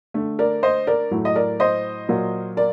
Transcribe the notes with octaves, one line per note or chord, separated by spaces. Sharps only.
D3 A3
A#4 D5
C5 D#5
A#4 D5
A2 F#3 A3
D#5
A#4 D5
C5 D#5
A#2 F#3 A#3
A#4 D5